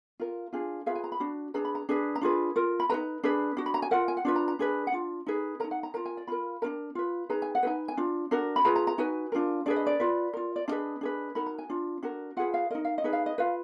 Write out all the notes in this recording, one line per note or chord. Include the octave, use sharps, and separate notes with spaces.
F4 A#4
D4 F4 G#4
F4 G#4 B4 F5
G#5
A#5
B5
D4 F#4
D4 G#4 B4 A#5
B5
A#5
D4 G#4 B4
A#5
D4 F4 G#4 B4
F4 A#4
B5
D#4 G#4 B4 A#5
D4 G#4 B4
D4 F#4
B5
A#5
G#5
F4 A#4 F#5
G#5
F#5
D4 F4 B4
A#5
A#5
D4 G#4 B4
F#5
D4 F4
D#4 G#4 B4
D#4 A#4 A#5
F#5
A#5
F4 A#4 A#5
G#5
D5
F4 A#4 B5
D4 F4 A#4 A#5
F4 B4
D#4 G#4 B4 A#5
G#5
F#5
D#4 G#4 B4 G#5
G#5
D4 F4
D4 F#4 A#4
B5
F4 G#4 B4 A#5
A#5
A#5
D#4 F#4 B4 G#5
D4 F4 A#4
D4 G#4 B4 D5
D#5
D5
F4 B4
F4 A#4
D5
D4 F4 G#4 B4 D#5
D4 G#4 B4
D#4 F#4 A#4 B5
A#5
G#5
D4 F4
D4 F#4 A#4
F4 G#4 B4 F#5
F5
D#4 A#4 D#5
F5
D#5
D#4 G#4 B4
F5
D#5
F4 B4 F5